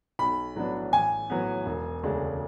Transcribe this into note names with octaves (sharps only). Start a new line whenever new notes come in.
B1 B5
A2 F#3 B3 D4
A1 G#5
A2 F#3 B3
E1
D2 C#3 G#3 D4